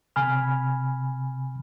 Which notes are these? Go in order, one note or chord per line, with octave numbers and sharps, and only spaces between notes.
C3 G#5 B5 F6